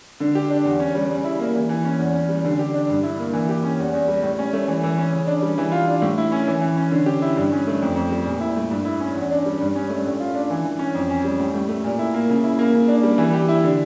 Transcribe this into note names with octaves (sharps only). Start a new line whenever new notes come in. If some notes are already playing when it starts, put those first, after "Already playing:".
D3
G4
D4
E2
C#4
G3
C#3
E4
A#3
E3
E3
C#4
E2
C#4
G3
D3
G4
D4
G2
E4
A#3
E3
G4
C#4
E2
E2
G3
A2
C#4
A3
E3
E3
C#4
C#3
D4
G3
E3
F4
D4
A2
E4
C#4
E3
E3
C#4
D3
G4
E4
G2
C#4
A3
F2
F2
G3
A#2
E4
A3
G2
E4
C#4
E2
D4
G3
G2
C#4
A3
A2
F4
D4
E3
E3
C#4
F2
C#4
G3
A2
A2
A3
A#2
E4
A#3
C#3
E4
A#3
C#3
D4
G3
E3
G4
E4
D3